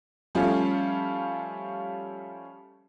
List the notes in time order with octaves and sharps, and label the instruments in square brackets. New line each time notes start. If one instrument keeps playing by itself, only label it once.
[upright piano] F3 G3 A3 C#4 F4